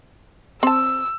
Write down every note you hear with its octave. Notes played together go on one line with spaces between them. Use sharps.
C4 A5 E6